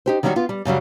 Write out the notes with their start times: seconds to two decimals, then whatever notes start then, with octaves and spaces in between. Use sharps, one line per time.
0.06 D#4 G4 C5
0.23 D#3 F#3 G3 C#4 E4 F#4
0.36 B3 F4
0.49 G3
0.65 F#2 C#3 F#3 G3